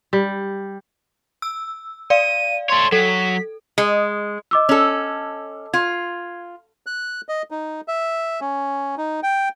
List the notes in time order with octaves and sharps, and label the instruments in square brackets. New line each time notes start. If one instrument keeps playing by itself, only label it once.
[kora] G3
[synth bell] E6
[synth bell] D5 F5 [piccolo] D#7
[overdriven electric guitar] A4 C#5 [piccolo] C6
[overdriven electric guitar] F#3 [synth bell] A4 [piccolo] B6
[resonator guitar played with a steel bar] G#3
[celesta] D#5 D6 E6
[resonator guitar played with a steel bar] C#4 A4
[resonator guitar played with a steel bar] F4 [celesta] G#6
[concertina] F#6
D#5
D#4
E5
C#4
D#4
G5